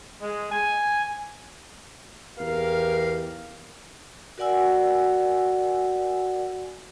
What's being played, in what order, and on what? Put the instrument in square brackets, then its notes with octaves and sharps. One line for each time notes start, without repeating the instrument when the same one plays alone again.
[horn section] G#3
G#5
[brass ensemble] E2 G4 A#4 F5
[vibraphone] F#4 A#4 D5 F#5 G#5 E6